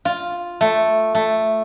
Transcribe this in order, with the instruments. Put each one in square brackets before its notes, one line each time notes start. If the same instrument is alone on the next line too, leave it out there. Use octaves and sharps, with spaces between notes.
[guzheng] F4
A3
A3